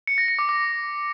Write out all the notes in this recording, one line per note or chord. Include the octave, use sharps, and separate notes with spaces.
C#7
A#6
C#7
D6
D6